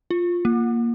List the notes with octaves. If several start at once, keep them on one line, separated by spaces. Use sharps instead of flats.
F4
A#3